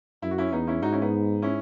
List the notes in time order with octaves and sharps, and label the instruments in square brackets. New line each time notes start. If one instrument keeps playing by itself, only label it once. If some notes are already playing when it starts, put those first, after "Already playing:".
[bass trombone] F#2 [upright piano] E4
[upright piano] F#4
C#4 E4
[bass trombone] E2 [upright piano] B3 D#4
[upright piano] C#4 E4
[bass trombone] G#2 [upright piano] D#4 F#4
[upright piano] C#4 E4
B3 D#4
C#4 E4